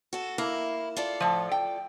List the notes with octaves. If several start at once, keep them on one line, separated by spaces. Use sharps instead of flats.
F#4 A4
A#3 E4
F4 A4 D5
A2 F3
G5